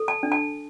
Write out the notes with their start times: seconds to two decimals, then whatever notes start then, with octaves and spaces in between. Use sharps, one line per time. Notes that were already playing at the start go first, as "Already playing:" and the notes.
Already playing: A4
0.08 A5
0.23 D4
0.32 A5